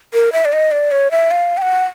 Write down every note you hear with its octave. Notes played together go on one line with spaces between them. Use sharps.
A#4
E5
D5
D#5
D5
C#5
E5
F5
G5
F#5